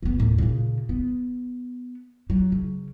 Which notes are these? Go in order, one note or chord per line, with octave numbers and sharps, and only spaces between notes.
E1 B3
D#2 A2
A#2 C#3
B3
F#3
C#3